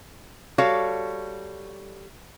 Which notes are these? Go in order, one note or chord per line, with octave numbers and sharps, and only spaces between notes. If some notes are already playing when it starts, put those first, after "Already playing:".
G3 F#4 A4 C#5 F5